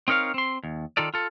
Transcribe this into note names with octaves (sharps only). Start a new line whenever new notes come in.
C4 D#4 A#4 C#5 F5
C4 C6
D#2
D#3 D#4 F4 A4 D5
F4 A4